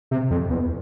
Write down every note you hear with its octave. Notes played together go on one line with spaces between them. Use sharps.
C3
F2
E2